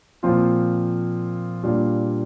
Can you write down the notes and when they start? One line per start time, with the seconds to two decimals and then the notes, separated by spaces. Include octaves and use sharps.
0.23 A#2 F3 C4 F4
1.63 A#2 G3 D4 F4